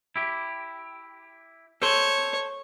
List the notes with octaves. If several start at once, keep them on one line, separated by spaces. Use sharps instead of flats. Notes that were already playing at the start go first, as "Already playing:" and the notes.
E4 G4
A4 C5 C#5